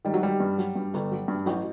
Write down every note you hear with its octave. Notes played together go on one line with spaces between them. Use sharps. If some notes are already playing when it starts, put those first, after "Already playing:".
D#3 G3
F#3
D#3 G3
G2
F#3
G2
G1
F#3
G2
A1 F#3